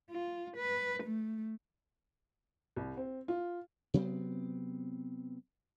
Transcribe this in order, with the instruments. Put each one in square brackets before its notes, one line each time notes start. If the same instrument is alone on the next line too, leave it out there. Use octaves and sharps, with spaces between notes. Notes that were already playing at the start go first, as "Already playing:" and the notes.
[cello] F4
B4
A3
[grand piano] C2
C4
F4
[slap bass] C3 F#3 B3 C4